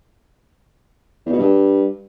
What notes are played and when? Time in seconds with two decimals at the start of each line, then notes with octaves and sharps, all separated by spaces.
1.26 E2
1.32 B2
1.39 G2